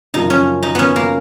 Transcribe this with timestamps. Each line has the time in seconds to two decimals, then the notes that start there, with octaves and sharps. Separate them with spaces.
0.14 F#2 C#3 F3 A#3 D#4 F4
0.30 C#4
0.63 D#4
0.75 B3 C#4
0.96 A#3